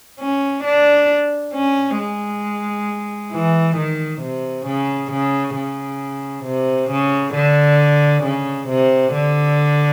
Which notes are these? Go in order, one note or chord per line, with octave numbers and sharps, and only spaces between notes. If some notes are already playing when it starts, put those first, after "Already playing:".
C#4
D4
C#4
G#3
E3
D#3
C3
C#3
C#3
C#3
C3
C#3
D3
C#3
C3
D3